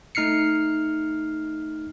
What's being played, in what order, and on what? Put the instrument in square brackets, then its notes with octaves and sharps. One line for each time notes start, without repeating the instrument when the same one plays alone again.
[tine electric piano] A3 D#4 F6 C7 C#7